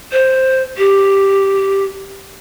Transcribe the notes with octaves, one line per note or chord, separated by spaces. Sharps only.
C5
G4